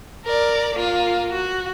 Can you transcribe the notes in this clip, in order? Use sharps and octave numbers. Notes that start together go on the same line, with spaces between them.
A#4 D5
A#3 F4
F#4